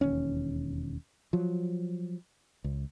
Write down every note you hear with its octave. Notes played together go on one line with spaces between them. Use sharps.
E1 D#2 C#4
F3 F#3
C#2